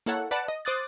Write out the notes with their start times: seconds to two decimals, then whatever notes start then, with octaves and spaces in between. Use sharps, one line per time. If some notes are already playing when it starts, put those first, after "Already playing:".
0.06 A#3 E4 A4 C#5 F#5
0.31 B4 D5 F#5 A5
0.48 D#5
0.65 C5 D6 D#6 F#6 A6